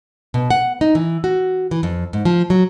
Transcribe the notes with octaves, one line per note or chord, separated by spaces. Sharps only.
B2
F#5
D#4
E3
F#4
E3
F2
G#2
F3
F#3